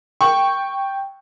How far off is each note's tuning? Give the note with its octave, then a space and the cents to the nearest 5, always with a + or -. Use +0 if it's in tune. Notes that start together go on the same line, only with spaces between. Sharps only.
G5 +0 C#6 -5